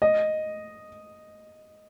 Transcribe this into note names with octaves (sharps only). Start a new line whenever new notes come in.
D#5